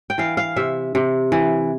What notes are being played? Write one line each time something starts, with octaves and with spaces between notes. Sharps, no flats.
G5
E3 F5
F5
C3 E5
C3
E3